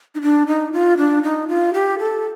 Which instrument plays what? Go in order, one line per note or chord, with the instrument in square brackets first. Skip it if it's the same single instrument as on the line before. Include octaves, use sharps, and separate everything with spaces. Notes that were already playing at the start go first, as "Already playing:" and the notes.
[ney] D#4
D4
D#4
F4
D4
D#4
F4
G4
A4